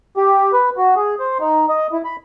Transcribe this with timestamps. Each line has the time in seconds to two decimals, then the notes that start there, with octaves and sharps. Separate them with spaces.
0.17 G4
0.53 B4
0.77 F#4
0.96 G#4
1.20 C5
1.40 D#4
1.69 D#5
1.93 E4
2.05 B5